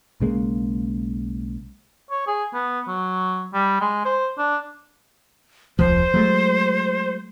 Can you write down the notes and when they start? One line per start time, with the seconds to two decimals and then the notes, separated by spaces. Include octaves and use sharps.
0.20 B1 C#3 G#3 A#3
2.11 C#5
2.27 G#4
2.54 B3
2.88 F#3
3.53 G3
3.81 G#3
4.05 C5
4.38 D4
5.79 E1 C#2 F3 C5
6.14 F#3 G#3 A3